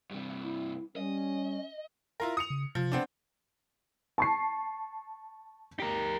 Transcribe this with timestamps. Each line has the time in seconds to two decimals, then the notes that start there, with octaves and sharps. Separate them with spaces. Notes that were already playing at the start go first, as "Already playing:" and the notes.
0.11 G2 C3
0.43 E4
0.96 G3 C#4 D#5
2.20 E4 F4 A#4
2.37 D#6 C#7 F7
2.50 C#3
2.75 C3 F3
2.92 B3 C4 D4
4.18 A5 C#6 C7
5.80 G4 A#4